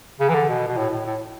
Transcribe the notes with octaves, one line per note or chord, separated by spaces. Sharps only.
C#3
E3
D3
B2
B2
A2
A2
A2